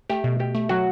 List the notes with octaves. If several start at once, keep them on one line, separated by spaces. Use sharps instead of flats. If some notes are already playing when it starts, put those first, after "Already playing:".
A3 G4
B2
B2 G4
A3
F#3 F#4